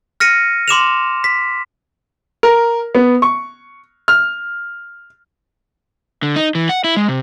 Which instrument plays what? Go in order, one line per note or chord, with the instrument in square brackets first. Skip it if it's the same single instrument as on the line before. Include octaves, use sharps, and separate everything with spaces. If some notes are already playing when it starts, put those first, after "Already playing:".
[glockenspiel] F6 A#6 C#7 D#7
C6 D6 E7 F7
B6
[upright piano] A#4
B3
C#6
F6
[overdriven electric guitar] D3
D#4
E3
F#5
E4
G#3
C3